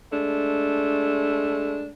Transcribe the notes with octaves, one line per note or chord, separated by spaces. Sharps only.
G#3 A3 D4